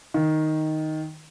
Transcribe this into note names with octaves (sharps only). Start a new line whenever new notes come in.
D#3